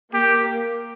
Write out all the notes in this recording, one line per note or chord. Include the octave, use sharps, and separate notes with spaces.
A#3 G4